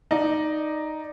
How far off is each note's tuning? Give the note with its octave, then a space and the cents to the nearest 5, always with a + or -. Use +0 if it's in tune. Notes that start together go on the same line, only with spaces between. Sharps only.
D#4 +0 D5 +10